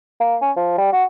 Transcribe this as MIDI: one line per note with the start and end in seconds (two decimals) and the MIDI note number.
0.20 0.36 58
0.41 0.51 61
0.57 0.74 53
0.78 0.89 55
0.92 1.04 66